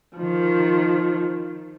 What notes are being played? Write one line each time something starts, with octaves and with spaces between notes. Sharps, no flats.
D#3 F3